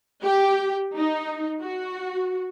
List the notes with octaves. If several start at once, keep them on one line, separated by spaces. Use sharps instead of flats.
G4
D#4
F#4